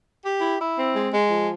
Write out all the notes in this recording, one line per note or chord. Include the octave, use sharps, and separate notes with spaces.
G4
E4
E4
C4
G#3
G#3
F3